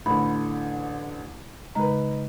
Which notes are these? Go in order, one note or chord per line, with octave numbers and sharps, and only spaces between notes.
A1 D3 B5
C#3 G#3 D#4 B4 A#5